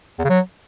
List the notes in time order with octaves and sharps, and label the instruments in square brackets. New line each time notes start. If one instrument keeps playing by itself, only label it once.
[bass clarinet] E2
C#3
F#3